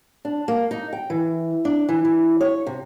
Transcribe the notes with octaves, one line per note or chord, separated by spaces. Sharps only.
D4
A#3
D#4
G5
E3
D4
E3
E3
C#5
C3